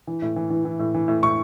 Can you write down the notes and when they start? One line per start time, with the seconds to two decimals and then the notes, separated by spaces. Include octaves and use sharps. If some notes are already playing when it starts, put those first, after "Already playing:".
0.07 E3
0.22 A2
0.36 E3
0.50 E3
0.65 E3
0.79 A2
0.94 E3
1.08 A2
1.23 A2 C#6